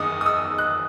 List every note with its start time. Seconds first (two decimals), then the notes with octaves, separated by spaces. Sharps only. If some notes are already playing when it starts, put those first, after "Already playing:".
Already playing: F#1 E2 D#3 D#6
0.21 D#6
0.26 E6
0.58 F#6